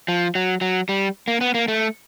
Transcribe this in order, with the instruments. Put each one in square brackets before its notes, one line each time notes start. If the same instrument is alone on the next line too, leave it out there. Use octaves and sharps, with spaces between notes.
[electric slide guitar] F3
F#3
F#3
G3
A#3
B3
A#3
A3